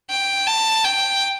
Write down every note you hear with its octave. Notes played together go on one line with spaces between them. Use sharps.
G5
A5
G5